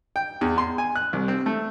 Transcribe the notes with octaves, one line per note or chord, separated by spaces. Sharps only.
G5
E2
C6
G#5
F#6
C2
C4
A3